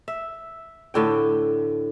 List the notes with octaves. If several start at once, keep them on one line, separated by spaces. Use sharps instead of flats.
E5
A2 D3 G5